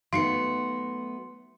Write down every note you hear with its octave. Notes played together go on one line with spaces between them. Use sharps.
F#3 A3 B3 D#4 F5 C6 C#7